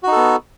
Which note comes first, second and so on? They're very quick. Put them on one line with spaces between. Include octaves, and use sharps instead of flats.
F#4 D#4 A4 B3